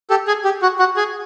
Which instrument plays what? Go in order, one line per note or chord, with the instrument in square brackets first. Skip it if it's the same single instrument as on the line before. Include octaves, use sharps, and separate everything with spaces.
[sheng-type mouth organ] G4 A4
G#4
G4
F#4
F#4
G#4